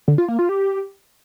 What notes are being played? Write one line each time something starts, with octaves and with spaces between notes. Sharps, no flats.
D3
F4
A#3
F4
G4